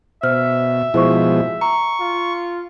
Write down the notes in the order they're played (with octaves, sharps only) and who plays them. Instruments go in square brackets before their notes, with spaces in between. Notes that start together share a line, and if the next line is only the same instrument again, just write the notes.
[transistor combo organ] B2 [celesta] C5 F6 [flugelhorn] E5
[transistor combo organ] B2 F3 G#3 [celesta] E4 C5 C#6
[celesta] A#5 [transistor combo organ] C#6
[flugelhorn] F4